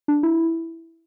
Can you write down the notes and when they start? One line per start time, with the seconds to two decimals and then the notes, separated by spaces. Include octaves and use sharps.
0.08 D4
0.23 E4